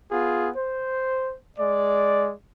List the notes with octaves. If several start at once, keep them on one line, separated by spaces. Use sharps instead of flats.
B3 F4 G#4
C5
G#3 D5